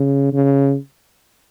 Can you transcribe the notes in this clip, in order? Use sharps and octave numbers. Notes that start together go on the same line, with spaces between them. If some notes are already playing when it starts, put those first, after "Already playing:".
Already playing: C#3
C#3